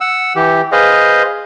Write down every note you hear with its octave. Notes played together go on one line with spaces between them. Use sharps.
F#5 E6
E3 G4
G#4 B4 C5 D#5 F5